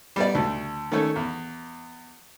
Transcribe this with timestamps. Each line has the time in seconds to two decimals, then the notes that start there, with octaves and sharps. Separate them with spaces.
0.16 G3 B3 D5
0.35 D2
0.91 D#3 A3 C#4 A4 C#5
1.16 E2